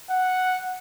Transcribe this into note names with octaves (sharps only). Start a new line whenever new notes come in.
F#5